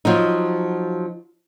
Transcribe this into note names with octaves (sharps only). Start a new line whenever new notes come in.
F3 F#3 D#4